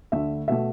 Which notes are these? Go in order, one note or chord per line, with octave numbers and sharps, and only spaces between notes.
D2 D3 A3 E5
B2 A3 E5